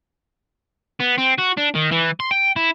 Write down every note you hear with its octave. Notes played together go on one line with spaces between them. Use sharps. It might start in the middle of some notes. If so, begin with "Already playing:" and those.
B3
C4
F#4
D4
D#3
E3
C6
G5
E4